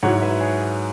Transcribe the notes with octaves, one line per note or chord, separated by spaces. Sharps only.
G#2 F#3 E4 C#5 F#5
C#5
B4 E5
G#4 C#5